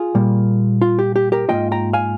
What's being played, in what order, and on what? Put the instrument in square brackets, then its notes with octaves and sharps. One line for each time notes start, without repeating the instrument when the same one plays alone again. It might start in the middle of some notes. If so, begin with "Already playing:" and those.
Already playing: [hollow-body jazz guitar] F4 G#4
A#2 G3 A#3
F4
G4
G4
G4 A#4
G#2 F3 A#3 F4 D#5 G5
G5 A#5
F5 G#5